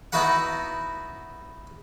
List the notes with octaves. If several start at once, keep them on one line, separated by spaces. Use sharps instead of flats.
B3 D#4 E4 F#4 B4 F#5